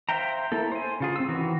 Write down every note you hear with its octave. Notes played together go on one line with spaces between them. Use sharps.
C5 E5 F5 G5 A#5
A#3 E4 A4
C5 G#5
C#3 F4 G#4
C4 E6
D#3 E3 F#4